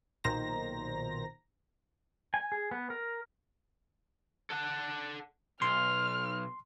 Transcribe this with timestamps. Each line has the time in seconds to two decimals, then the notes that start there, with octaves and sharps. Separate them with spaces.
0.24 B1 A#2 D#3 C5 A#5 A#6
2.34 G#5
2.52 G#4
2.71 B3
2.90 A#4
4.51 A4 F#5
5.62 B1 C6 F6